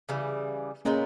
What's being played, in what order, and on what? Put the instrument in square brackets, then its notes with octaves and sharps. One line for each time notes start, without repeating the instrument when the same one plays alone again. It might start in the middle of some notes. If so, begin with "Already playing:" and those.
[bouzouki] C#3 E3 G3
[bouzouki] A#2 G#3 B3 D#4 [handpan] A#3 C#4